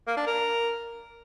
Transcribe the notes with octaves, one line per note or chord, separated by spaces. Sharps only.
A#3
D4
A#4